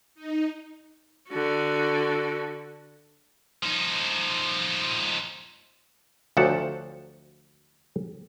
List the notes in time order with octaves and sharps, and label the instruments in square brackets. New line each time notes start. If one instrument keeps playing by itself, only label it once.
[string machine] D#4
[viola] D3 F#4
[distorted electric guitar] F3 D#4
[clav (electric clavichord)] D2 F3 F#3 G4 F#5 A5